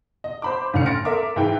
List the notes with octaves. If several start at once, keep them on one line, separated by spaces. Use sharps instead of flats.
D#5
C5 B5 D6
D2 A2 C#4 F5 F6 C#7
C6 A6 A#6 C#7 D7
A4 A#4 E5 C6 D6
G#2 E3 E4 B4 F5 G5